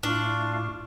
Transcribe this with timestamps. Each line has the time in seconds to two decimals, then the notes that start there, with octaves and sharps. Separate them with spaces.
0.03 A2 D4 E4 F4 C#6 F6